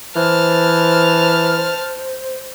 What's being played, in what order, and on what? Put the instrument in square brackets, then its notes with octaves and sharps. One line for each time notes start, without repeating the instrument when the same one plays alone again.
[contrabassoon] E3 [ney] C5 [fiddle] A5 F6